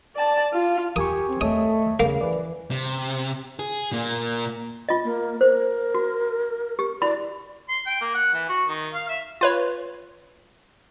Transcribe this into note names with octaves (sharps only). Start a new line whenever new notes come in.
D5 A5
F4
G4 A#4 G#5 C#6 D#6
C4
A3 A4 C#5 D#5 D#6
C#3 A#3
E3 B4 D5
C3
G#4
A#2 A#3
F4 D#5
A#3
A#4 C5
F#4
G4
E4 F#4 D5 B5
C6
G5
A#3
F#5
E3
F#4
D#3
F5
E5
F4 B4 C#5